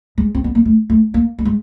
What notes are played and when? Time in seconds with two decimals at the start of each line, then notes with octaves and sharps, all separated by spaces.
0.18 G#3
0.35 C4
0.44 B3
0.55 A#3
0.65 A3
0.90 A3
1.14 A#3
1.39 A3
1.45 G#3